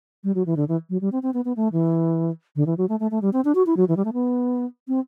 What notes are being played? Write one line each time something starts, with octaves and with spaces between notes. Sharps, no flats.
G3
F#3
E3
D3
E3
F#3
G3
C4
C4
B3
B3
A3
E3
D3
E3
F#3
A3
A3
A3
G3
C4
D4
F#4
E4
F#3
E3
G3
A3
B3
C4